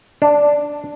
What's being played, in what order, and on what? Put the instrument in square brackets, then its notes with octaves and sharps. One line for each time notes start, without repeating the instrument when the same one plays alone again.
[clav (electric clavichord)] D4